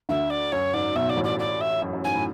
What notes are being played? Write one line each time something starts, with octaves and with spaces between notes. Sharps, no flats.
D2 D3 E5
D5
F#2 C#5
G#2 D5
B1 B2 E5
B2 D5
A1 A2
D5
D5
E5
F#2
F#2
G#2 G#5
A2